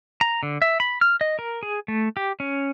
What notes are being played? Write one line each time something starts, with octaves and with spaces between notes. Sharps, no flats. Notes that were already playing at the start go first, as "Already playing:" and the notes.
A#5
D3
E5
B5
F6
D#5
A#4
G#4
A3
G4
C#4